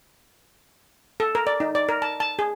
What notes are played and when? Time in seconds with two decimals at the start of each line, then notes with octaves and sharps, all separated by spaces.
1.20 A4
1.35 A#4
1.47 D5
1.60 D#4
1.75 D5
1.89 A#4
2.02 A5
2.20 A5
2.39 G#4